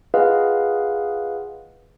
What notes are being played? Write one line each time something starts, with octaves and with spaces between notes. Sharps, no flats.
F4 G#4 B4 D#5 F5 F#5